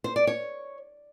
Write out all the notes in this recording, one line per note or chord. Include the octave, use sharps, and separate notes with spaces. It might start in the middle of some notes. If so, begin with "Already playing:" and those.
C5
D5
C#5